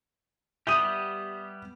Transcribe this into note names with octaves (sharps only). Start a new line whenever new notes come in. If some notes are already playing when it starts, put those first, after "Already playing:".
G3 B3 G4 E5 D#6 G6 D#7